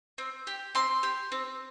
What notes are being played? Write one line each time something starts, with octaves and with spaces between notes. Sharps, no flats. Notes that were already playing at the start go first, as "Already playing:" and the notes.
C4
G4
C4 C6
G4
C4